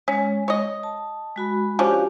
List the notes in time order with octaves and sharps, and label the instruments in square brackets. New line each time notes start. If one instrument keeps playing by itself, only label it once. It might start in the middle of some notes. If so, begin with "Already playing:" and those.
[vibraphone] G#3 [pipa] C#4
[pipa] C#5 D#5
[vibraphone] A5
G#3 F#4 B5
[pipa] F3 C#4 D4 [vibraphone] F#4 G4 F5